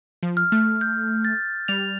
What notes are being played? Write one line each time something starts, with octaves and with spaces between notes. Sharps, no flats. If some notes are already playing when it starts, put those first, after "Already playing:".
F3
F6
A3
G6
A6
G3 F7